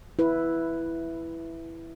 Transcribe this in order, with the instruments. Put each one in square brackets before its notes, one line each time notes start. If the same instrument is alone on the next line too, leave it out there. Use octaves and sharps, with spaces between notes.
[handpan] E4 B4